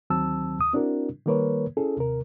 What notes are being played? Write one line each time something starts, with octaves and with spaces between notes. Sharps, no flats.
D2 D#3 F#3 C4 A5 E6
D#2 D#6
C4 D4 E4 F#4 A#4
D#3 G3 A#3 A#4 B4 C#5
C#4 E4 G#4 A4
D#2 C3 A#4